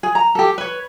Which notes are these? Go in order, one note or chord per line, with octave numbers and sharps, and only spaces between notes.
G#4
A#5
G4 A4
B4 C#5